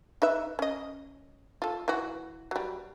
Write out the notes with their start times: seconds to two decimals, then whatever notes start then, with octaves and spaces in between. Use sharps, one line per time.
0.22 D#4 B4 E5
0.59 C#4 D#5
1.62 F4 A4
1.88 E3 F#4
2.51 F#3 G3